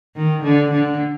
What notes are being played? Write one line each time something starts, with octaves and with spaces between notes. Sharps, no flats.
D#3
D3
D3